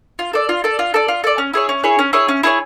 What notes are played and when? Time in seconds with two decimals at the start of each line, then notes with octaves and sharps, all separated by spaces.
0.19 F4
0.33 A4 D5
0.49 F4
0.64 A4 D5
0.79 F4
0.94 A4 D5
1.08 F4
1.24 A4 D5
1.38 C#4
1.53 E4 G#4 C#5
1.69 C#4
1.83 E4 G#4 C#5
1.99 C#4
2.13 E4 G#4 C#5
2.28 C#4
2.43 E4 G#4 C#5